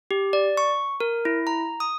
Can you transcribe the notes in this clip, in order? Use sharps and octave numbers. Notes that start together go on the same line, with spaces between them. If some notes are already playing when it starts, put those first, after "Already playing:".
G4
D5
C#6
A#4
E4
A#5
D#6